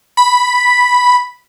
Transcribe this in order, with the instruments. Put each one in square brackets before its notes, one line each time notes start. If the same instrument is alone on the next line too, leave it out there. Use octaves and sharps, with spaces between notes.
[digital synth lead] B5